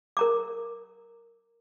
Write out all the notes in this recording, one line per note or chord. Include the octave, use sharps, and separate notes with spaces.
A#4 A#5 D6